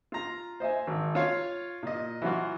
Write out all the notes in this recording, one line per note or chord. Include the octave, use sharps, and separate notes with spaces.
F4 A#5
C5 D#5 E5 G#5
G#1
F4 C#5 F5
A#2 D#5
E3 F#3 F4 F#4